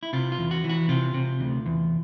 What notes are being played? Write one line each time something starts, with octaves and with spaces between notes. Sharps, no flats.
E4
C3 F4
F4
E2
F#4
E3
F#4
C3 F4
C3
D2
E2